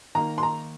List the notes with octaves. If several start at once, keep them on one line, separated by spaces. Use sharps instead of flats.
D#3 A#3 A#5
C6
A#5